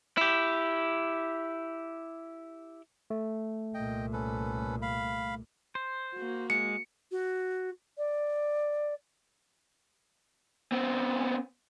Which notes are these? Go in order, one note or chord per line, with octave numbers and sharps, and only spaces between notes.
E4 G4
A3
C2 A#2 D#5 G5
C#4 A4 B4
F5 B5
C5
A#3 F#4
G#3 C#7
F#4
D5
B3 C4